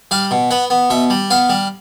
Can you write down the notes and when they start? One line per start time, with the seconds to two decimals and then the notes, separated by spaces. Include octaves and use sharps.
0.11 G3 F5
0.31 B2
0.51 B3 F#5
0.70 B3
0.90 B2 E5
1.10 G3
1.31 B3 F5
1.49 G3